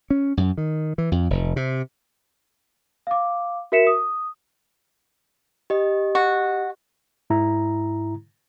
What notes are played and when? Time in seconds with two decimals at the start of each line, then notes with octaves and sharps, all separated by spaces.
0.10 C#4
0.37 F#2
0.58 D#3
0.98 E3
1.12 F2
1.30 F1
1.56 C3
3.07 F5 D6
3.72 F#4 A#4 E5 B6 C#7 E7
3.87 D#6
5.70 G4 D#5
6.15 F#4
7.30 G#2 E4 A#5